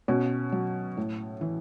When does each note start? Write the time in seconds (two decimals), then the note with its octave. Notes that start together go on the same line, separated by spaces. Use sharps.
0.08 B2 C#4
0.52 F#3
0.97 A2
1.41 E3